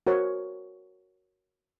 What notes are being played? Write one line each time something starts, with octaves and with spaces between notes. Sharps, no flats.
F#4 A#4 C5 C#5